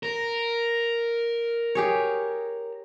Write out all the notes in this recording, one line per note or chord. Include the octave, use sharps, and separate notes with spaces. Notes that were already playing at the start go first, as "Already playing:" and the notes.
A#4
G4 G#4 C#5